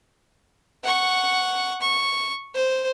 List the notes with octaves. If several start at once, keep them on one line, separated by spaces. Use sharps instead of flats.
F#5 C#6
C#6
C5